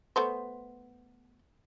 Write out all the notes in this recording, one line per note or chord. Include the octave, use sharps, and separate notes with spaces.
A3 B3 C5